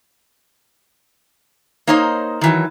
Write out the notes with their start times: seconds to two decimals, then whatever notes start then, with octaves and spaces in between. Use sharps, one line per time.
1.87 A#3 D#4 C5 C#5 D#5
2.41 D#3 E3 F#3